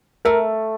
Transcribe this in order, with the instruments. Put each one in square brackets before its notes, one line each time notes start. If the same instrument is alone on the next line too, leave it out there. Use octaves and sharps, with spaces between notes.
[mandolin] A3 [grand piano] A#4